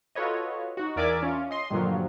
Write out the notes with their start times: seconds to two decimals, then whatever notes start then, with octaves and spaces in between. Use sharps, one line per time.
0.15 F4 F#4 A4 B4 C#5 D#5
0.77 D#4 F#4
0.96 E2 A#4 D5 E5 G#5 D6
1.23 C#4 F4
1.51 D#5 C6
1.70 G2 A#2 D3 F3 F#3